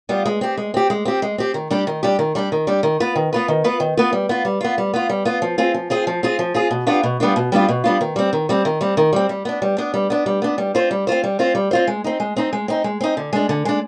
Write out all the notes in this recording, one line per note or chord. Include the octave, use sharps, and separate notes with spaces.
G3 B3 F4
G#3
C4 G4
G#3
C4 G4
G#3
C4 G4
G#3
C4 G4
D#3
G3 D4 G4
D#3
G3 D4 G4
D#3
G3 D4 G4
D#3
G3 D4 G4
D#3
B3 F4 B4
D#3
B3 F4 B4
D#3
B3 F4 B4
D#3
B3 F4 B4
G3
B3 F4
G3
B3 F4
G3
B3 F4
G3
B3 F4
F3
C4 F4 G#4
F3
C4 F4 G#4
F3
C4 F4 G#4
F3
C4 F4 G#4
B2
G3 B3 D4 F4
B2
G3 B3 D4 F4
B2
G3 B3 D4 F4
B2
G3 B3 D4 F4
D#3
G3 C4
D#3
G3 C4
D#3
G3 C4
D#3
G3 C4
G3
B3 D4
G3
B3 D4
G3
B3 D4
G3
B3 D4
G3
C4 F4 C5
G3
C4 F4 C5
G3
C4 F4 C5
G3
C4 F4 C5
G#3
C4 D#4
G#3
C4 D#4
G#3
C4 D#4
G#3
C4 D#4
D3
G#3 D4
D3
G#3 D4